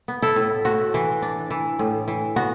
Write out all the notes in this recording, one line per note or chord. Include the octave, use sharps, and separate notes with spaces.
B3
E4 A4
A2
A3 F#4
E3
D4
E3
A2
E3
B3 F#4